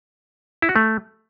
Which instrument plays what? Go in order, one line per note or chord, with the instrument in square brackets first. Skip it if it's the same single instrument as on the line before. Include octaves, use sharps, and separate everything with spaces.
[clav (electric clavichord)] E4
F#4
A3